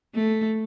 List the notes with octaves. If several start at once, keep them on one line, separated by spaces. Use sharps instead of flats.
A3